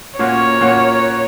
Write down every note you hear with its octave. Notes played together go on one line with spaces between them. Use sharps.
A#2 A#3 C#4 F#4 C#5
A#2 A#3 C#4 F#4